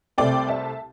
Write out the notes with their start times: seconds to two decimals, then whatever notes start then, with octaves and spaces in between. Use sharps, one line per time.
0.18 C2 C3 A3 C4 D5 G5
0.49 E5 A5